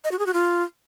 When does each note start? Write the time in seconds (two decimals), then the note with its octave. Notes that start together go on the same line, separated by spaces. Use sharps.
0.04 D#5
0.11 F#4
0.19 G#4
0.26 F#4
0.33 F4